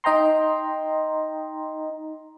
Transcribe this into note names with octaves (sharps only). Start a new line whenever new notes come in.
D#4 D#5 G5 A#5 C6